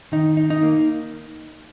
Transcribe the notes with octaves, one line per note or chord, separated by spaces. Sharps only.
D#3 D#4
D#4
D#4
A#3